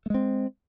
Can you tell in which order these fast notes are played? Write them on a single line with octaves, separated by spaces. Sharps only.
A3 G#3 C4